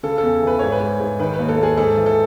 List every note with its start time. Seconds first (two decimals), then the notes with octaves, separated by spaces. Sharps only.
0.03 C#3 A4
0.18 E2 A4
0.42 E3 B4
0.59 G#2 C#5
0.72 B4
0.81 G#2
1.00 G#2
1.19 D#3 B4
1.34 B4
1.39 D#2
1.49 A4
1.58 D#2 G#4
1.77 G#2 A4
1.97 E3
2.06 A4